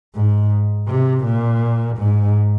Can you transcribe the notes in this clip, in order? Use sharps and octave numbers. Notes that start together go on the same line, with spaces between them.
G#2
C3
A#2
G#2